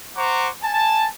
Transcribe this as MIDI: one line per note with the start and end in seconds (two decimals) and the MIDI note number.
0.17 0.49 72
0.17 0.49 78
0.17 0.49 82
0.17 0.49 85
0.17 0.49 86
0.63 1.08 80
0.63 1.08 81